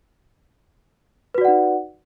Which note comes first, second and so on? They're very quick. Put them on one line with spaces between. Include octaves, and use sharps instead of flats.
B4 F#4 D5 F#5 D#4